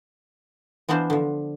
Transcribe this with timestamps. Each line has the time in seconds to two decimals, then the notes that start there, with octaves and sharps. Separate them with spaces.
0.89 E3 B3 D4 F4 C5
1.10 D3 F3